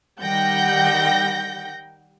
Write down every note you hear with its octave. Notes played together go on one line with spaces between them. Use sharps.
D#3 G3 F#5 G5 G6 A#6